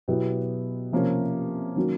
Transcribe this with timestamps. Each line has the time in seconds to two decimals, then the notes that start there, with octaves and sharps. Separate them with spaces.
0.08 B2 F#3 B3 E4 G4
0.92 C3 F3 A#3 C#4
1.76 D#3 F#3 A#3 C#4 F#4